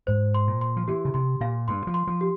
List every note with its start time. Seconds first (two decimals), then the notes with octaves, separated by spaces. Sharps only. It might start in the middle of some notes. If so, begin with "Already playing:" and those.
0.07 G#2 C5
0.34 C6
0.47 A#2
0.61 C6
0.77 F3
0.88 E3 G4
1.05 C#3
1.14 C3 C6
1.41 A#2 F5
1.68 G2 C6
1.87 F3
1.94 C6
2.07 F3
2.21 G4